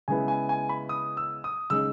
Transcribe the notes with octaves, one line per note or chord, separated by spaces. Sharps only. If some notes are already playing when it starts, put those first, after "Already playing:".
C#3 G#3 B3 E4 G#5
G#5
G#5
B5
D#6
E6
D#6
C#3 G#3 D#4 E6